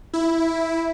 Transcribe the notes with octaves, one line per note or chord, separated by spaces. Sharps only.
E4